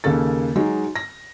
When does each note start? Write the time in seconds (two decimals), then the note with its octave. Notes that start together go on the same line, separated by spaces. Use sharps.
0.04 D#2 C#3 A#3 A4 A6
0.56 F#3 G#3 D#4
0.96 A#6